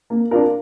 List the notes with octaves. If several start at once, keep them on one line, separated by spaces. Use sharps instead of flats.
A#3
D4 F4 A#4